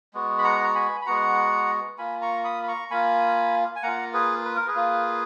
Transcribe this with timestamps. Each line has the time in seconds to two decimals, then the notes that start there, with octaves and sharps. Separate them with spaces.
0.14 G#3 B3 F#4
0.38 B5
0.44 F#5 A#5
0.64 A#5
0.75 G#5 B5
1.02 B5
1.06 G#3 B3 F#4 F#5 A#5
1.98 A#3 F4 G#5 B5
2.21 A#5 C#6
2.44 B5 D#6
2.63 B5
2.68 A#5 C#6
2.90 A#3 F4 G#5 B5
3.76 G#5
3.83 A#3 F4 F#5 A#5
4.14 G#4 B4
4.45 B4
4.56 A#4
4.67 G#4 B4
4.76 A#3 F4